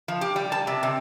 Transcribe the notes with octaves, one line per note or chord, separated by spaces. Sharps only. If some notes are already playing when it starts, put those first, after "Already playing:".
F3
G4
G3
A5
C3
C3